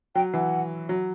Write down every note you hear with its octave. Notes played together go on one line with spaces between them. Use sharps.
F#3 G5
E3 F#5
F#3